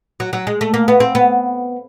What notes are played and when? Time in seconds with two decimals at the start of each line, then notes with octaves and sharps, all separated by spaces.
0.20 F#3
0.33 F#3
0.47 G#3
0.61 A3
0.74 A#3
0.88 B3
1.00 C4
1.15 B3